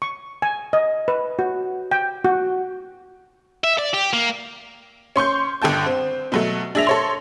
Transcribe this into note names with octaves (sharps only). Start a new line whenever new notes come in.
C#6
G#5
D#5
B4
F#4
G5
F#4
E5
D5
G4
A#3
C#4 C6 C#6 G6
G1 D3 G5 A5 G6
C4
B2 F#3 A3
D4 G#4 E5 A#6 F7
A4 C#5 C6